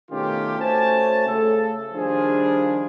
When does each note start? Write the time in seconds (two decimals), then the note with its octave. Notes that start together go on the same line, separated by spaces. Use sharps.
0.11 B2 D#3 A3 C#4 F4 G4
0.59 A3 C#4 F#4 C5 G#5 A5
1.27 C#3 A3 A4
1.94 D#3 F3 G3 D4 F4 G#4